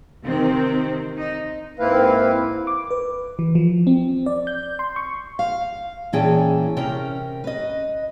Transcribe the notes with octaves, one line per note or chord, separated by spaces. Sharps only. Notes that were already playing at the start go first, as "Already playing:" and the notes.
C3 D#3 C4
D#4
G#2 A#3 C4 E4 B4 F5
D6
B4
E3
F3
C4
D5
G6
C6
C#6
F5
A#2 E3 C#4 G#4 G5 A5
C3 C#4 A#4 G5
B4 D#5